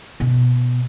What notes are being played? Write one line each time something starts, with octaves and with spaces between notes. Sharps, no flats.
B2